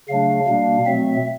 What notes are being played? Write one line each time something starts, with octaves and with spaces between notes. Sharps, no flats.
C#3 F#3 A3 D4 F5
B2 G3 A#3 D4
B2 F#3 A3 C4 E5